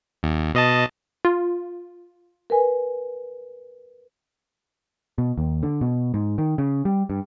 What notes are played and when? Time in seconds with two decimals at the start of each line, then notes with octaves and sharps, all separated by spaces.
0.23 D#2
0.54 B2 D#5 A5
1.25 F4
2.50 A#4 B4 G#5
5.18 B2
5.38 D#2
5.63 D3
5.81 B2
6.14 G#2
6.38 D#3
6.58 C#3
6.85 G3
7.10 G2